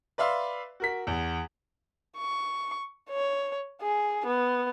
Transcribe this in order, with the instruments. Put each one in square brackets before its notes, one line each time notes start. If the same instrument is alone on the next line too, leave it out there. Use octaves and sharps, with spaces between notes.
[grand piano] B4 D5 E5 F5 C6
F#4 A#4 B6
E2
[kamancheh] C#6
C#5
G#4
B3